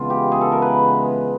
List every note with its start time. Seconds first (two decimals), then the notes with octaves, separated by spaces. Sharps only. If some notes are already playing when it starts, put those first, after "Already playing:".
Already playing: C#3 E3 G#3 B3 F4
0.10 G4
0.32 G#4
0.41 A4
0.52 A#4
0.62 B4